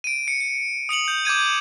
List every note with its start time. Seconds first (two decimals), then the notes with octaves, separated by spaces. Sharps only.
0.04 D7 D#7
0.28 C#7
0.40 C#7
0.89 D#6 C#7 F7 F#7
1.08 G6
1.25 D6 G6 G#6 D#7